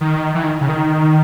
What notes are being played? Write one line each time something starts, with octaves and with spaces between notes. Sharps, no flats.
D#3
E3
D#3
C#3
D#3